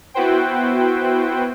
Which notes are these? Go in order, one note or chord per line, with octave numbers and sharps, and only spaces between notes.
B3 E4 F#4 B4 C5 G5